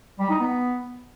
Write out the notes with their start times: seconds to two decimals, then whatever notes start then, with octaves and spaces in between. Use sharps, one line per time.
0.19 G3
0.30 D#4
0.40 B3